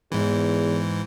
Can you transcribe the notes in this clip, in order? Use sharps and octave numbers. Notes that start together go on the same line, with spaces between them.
E2 G#2 E3